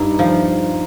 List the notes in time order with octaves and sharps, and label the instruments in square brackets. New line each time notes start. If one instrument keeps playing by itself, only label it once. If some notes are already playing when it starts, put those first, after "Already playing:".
Already playing: [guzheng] G2 [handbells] D#4
[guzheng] F3